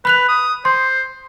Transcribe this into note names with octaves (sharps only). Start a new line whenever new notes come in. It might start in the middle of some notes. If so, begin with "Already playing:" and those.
B4 B5 F#6 F7
D#6
C5 C6